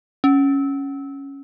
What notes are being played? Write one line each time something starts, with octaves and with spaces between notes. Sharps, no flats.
C#4